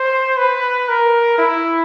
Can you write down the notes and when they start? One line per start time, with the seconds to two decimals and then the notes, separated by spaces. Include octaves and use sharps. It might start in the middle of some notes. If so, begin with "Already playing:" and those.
Already playing: C5
0.37 B4
0.88 A#4
1.38 E4